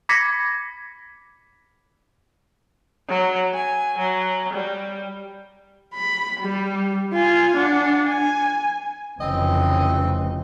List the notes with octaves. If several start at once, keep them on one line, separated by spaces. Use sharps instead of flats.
B5 D6 G#6 A#6 B6 C#7
F#3
G#5
F#3
G3
B5
G3
F4 G#5
D4 F#5
G#5
F1 C#3 E3 C4 D#5